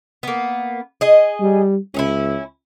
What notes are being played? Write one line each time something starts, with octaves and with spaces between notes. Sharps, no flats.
A#3 B3
G#4 D#5
G3
C#2 C#4 D#4 E4